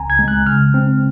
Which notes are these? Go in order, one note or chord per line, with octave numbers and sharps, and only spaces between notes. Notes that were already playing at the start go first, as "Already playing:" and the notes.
Already playing: C#2 C#3 C4 G#5 A#5
G#6
G#3
F#6
C#3 F6
C4